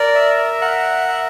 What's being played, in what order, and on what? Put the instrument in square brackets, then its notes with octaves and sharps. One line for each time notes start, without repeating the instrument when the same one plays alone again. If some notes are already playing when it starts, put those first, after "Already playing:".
Already playing: [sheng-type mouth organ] A#4 [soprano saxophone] D5
[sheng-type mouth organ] E5
[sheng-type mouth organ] A#4 [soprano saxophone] F#5
[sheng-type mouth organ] E5